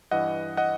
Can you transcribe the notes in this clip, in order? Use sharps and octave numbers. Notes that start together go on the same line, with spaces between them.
G2 E3 D#5 F#5
D#5 F#5